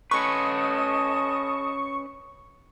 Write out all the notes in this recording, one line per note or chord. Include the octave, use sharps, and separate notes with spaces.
C#4 A4 B4 D#5 C#6 D#6